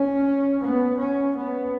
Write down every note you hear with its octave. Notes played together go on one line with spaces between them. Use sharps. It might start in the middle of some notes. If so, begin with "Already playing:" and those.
Already playing: C#4
B3
C#4
B3